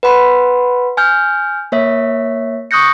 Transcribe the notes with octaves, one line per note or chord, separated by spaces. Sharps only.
B4 F#5 B5 C6
G#5 F6 G6
A#3 C#5 E5 B6
C#6 D#6 F#6 G6 A#6 C#7